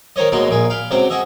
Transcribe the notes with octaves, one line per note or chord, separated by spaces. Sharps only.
D#3 D#4 C5 C#5 D#5
D#2 B2 F#3 G#3 F#4 C6
A#1 A#2 G#4
F5 G5 B5
C#2 C3 F#3 C5 G5
F#4 G#4 D#5 E5